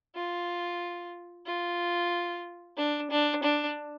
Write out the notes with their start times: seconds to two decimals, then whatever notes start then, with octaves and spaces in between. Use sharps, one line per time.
0.15 F4
1.46 F4
2.77 D4
3.11 D4
3.43 D4